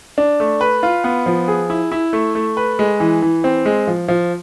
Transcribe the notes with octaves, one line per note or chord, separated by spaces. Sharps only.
D4
A3
B4
F4
B3
F3
G#4
E4
E4
A3
A3
B4
G#3
E3
E3
C4
G#3
F3
F3